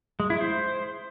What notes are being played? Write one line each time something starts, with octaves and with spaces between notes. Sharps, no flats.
G#3
E4
C5